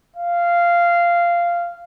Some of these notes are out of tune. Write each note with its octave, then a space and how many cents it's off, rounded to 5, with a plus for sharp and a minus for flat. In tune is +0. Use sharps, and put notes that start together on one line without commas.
F5 -10